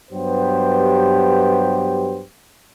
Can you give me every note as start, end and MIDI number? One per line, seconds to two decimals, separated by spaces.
0.12 2.23 43
0.12 2.23 54
0.12 2.23 59
0.12 2.23 67
0.12 2.23 72